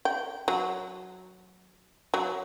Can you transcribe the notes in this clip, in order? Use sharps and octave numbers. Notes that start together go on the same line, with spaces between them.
G5
F#3
F#3